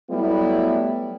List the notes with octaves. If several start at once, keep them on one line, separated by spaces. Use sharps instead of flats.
F#3 G3 A3 B3 E4